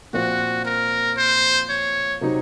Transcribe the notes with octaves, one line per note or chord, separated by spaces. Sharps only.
A#2 F3 C4 F4 F#4
A#4
C5
C#5
C3 F#3 C4 D#4